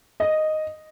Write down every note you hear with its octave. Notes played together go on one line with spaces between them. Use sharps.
D#5